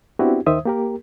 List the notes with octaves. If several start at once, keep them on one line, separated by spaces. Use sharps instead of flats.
B3 C4 D4 E4 F#4 G4
D#2 D#3 C5 E5 D#6
A#3 G4 A#4